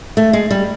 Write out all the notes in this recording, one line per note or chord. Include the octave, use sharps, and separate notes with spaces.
A3
G#3
G3